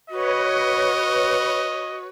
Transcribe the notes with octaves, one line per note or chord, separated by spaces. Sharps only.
F#4 B4 C#5 D#5